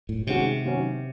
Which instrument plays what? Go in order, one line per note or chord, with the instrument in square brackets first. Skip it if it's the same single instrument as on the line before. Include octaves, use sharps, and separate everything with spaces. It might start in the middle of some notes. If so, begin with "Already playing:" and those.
[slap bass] A2
[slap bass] C3 [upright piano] D#3 G#3 C#4 F#4
[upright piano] D#3 F#3 C#4